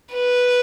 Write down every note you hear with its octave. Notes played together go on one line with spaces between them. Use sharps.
B4